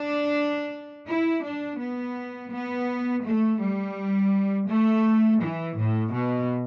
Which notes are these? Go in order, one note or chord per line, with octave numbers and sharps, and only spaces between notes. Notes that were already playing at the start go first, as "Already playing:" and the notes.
Already playing: D4
E4
D4
B3
B3
A3
G3
A3
E3
A2
B2